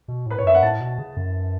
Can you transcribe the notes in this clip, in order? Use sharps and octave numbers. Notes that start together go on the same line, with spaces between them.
B2
A2 B4
A2 C#5
F#2 E5
F#5
A2 A5
B2
C#3
F#2